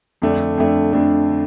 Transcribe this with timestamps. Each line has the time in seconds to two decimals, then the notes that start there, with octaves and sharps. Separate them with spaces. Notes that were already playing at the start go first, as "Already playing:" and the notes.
0.22 F2 D3 A3 D4
0.58 F2 D3 A3 D4
0.93 F2 D3 A3 D4
1.29 D3